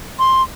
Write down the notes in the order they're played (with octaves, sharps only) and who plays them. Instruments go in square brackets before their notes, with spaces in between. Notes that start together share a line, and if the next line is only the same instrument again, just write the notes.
[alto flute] C6